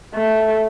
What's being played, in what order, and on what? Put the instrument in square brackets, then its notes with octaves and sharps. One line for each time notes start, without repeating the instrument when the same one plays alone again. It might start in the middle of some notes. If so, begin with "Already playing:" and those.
[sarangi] A3